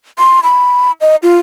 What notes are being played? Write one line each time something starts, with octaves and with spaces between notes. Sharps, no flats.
C6
B5
D#5
F4